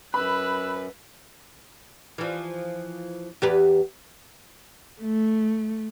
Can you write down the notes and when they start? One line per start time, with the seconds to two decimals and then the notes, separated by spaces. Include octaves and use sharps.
0.14 F#2 B4 B5 E6 F#6
2.18 E3 F3
3.42 E2 G4 B4
5.01 A3